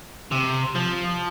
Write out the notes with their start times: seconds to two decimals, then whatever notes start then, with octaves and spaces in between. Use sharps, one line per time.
0.31 C3
0.75 F3